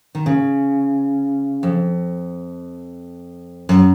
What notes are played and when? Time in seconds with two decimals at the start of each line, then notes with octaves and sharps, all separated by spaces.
0.15 D#3
0.26 C#3
1.63 F2
3.69 F#2